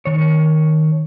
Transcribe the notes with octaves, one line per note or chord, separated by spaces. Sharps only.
D#3 C#5